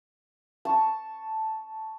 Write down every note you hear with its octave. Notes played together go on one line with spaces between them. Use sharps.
A5 C#6